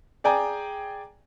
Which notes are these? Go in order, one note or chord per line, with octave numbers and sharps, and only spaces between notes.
G#4 D5 G5 G#5 A#5